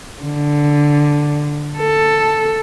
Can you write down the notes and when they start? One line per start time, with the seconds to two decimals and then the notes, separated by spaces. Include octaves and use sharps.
0.22 D3
1.79 A4